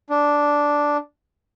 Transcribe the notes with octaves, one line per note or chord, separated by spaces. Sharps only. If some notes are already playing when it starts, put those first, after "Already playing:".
D4